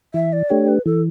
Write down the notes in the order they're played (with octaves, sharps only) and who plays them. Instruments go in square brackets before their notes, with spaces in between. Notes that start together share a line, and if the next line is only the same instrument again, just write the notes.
[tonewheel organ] E3 [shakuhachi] E5
[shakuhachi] D5
[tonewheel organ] A3 D4 G4 [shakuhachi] C#5
[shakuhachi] B4
[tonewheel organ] E3 [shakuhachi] A4